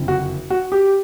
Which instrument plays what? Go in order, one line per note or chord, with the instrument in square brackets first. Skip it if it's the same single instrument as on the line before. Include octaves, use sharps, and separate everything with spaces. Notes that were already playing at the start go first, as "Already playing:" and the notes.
Already playing: [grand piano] F#1 F2 D3
F#4
F#4
G4